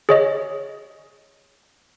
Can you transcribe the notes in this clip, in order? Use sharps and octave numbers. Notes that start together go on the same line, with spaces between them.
G#4 C#5 D#5